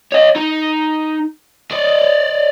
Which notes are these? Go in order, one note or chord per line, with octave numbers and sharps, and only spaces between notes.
C#5 D#5
D#4
D5 D#5